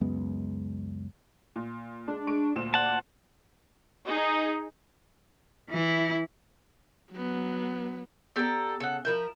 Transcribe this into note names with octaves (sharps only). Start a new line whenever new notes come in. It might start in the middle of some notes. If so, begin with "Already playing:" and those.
C#2 F#2 G#3 B3
A#2
G#3 D4
G#3 C#6 D7
D2 A#2 E7
D5 F#5 A5
D#4 G#4 D#5
E3 E4
F#3 B3
B3 D4 G4 A4 A#5
C#3 A4 F#5
F3 A#4 E5 B5 G6